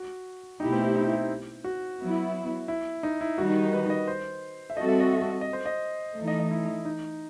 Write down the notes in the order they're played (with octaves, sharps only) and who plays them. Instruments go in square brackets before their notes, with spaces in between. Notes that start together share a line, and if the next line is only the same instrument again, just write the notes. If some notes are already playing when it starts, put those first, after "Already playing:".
Already playing: [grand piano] F#4
[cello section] B2 A3 E4 G4 [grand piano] D#4
[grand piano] C4
C4
D#4
E4
F#4
[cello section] F#3 B3 E4
[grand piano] E4
D#4
E4
[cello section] D#3 G3 D#4 [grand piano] F#4
[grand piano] B4
D#5
C5
E5
[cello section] G3 C4 F#4 A4 [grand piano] D#5
[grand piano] E5
D#5
E5
E5
D#5
C5
D#5
[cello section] E3 A3 D#4
[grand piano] D#5
D#5
E4
D#4